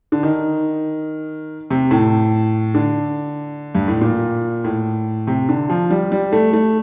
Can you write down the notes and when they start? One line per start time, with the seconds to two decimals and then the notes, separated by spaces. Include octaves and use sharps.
0.12 D3
0.23 D#3
1.71 C3
1.91 A2
2.74 D3
3.75 G2
3.88 A2
4.01 A#2
4.64 A2
5.27 C3
5.49 D3
5.69 F3
5.91 G3
6.12 G3
6.33 A3
6.53 A3